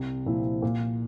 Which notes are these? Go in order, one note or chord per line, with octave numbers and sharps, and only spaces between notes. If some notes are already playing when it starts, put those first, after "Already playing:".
Already playing: C2
A#2 F3 C4 E4
A#2